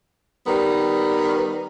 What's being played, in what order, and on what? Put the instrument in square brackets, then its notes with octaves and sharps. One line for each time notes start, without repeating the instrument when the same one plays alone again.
[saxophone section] D#3 G3 B3